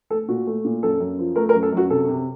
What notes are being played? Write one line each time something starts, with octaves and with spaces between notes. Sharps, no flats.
A3 A4
A#2 F#4
A3
A#2
F#2 A4
F#2
F3
A3 A#4
A#4
F#2
A4
F#2 F#4
C3 A4
C3